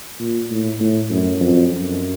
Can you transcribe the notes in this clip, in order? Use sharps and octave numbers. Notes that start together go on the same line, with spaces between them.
A#2
A2
A2
F#2
F2
F#2